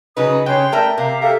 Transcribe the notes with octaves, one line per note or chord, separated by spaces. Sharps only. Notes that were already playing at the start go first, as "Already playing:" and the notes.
C#3 F#3 D#4 B4 D#6
C#3 C#5 G5 C6 F#6
A3 A#4 D5 E5
C3 A#4 E5 F5 D6
G4 A4 A#4 E5 F5